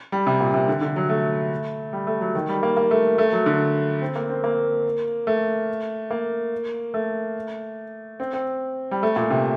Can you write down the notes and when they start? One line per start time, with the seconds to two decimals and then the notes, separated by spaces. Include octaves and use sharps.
0.12 G3
0.27 C3
0.40 A#2
0.54 C3
0.68 D3
0.81 D3
0.96 F#3
1.09 A3
1.93 G3
2.07 A3
2.21 F#3
2.35 D#3
2.49 G3
2.63 A#3
2.77 A#3
2.91 A3
3.18 A3
3.33 F#3
3.46 D3
4.02 C4
4.16 A#3
4.29 C4
4.44 A#3
5.27 A3
6.10 A#3
6.94 A3
8.20 C4
8.33 C4
8.91 G3
9.03 A3
9.16 A#2
9.30 C3